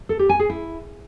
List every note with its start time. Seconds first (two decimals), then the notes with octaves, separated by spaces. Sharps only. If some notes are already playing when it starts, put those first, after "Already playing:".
0.09 A4
0.19 G4
0.29 G#5
0.40 G#4
0.50 E4